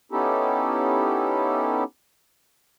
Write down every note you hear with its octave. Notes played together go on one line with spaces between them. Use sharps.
B3 C#4 D#4 E4 G4 A4